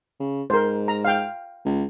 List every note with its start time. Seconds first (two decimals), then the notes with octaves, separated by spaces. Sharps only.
0.19 C#3
0.50 G#2 A#4 C5
0.88 A#5
1.05 F5 G5
1.65 C#2